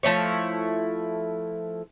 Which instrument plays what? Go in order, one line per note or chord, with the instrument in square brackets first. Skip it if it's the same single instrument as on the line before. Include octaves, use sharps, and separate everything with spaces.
[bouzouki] F3 A3 E4 C#5